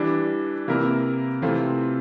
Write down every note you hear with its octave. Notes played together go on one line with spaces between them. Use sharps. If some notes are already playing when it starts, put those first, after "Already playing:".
Already playing: E3 G3 D4
C3 E3 A#3 E4 A#4
C3 E3 A3 C4 F4